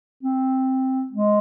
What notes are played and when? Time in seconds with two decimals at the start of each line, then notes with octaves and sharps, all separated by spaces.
0.23 C4
1.13 G#3